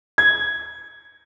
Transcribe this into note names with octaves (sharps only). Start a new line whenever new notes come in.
G#6